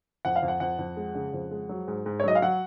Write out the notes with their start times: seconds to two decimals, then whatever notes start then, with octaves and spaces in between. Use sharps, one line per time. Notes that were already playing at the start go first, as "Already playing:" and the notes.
0.25 F2 F#5
0.36 F5
0.42 F2
0.48 F#5
0.60 F2 F#5
0.79 F2
0.97 G#3
1.15 C#3
1.33 F2
1.51 G#3
1.69 F#3
1.88 G#2
2.06 G#2
2.20 C#5
2.24 F#3 D#5
2.35 F5
2.42 F#3 F#5